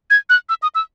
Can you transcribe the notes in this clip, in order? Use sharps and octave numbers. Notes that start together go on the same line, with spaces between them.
G#6
F#6
E6
D#6
E6